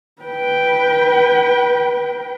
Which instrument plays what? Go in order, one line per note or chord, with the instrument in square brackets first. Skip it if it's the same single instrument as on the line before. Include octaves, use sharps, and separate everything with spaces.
[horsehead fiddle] B4 G5